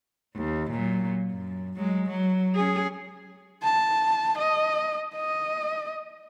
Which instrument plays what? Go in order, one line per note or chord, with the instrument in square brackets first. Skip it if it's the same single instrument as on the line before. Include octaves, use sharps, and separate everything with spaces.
[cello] D#2
A#2 F#3
F#2
F#3 G#3
F#3
C#4 G#4
[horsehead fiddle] A5
D#5
D#5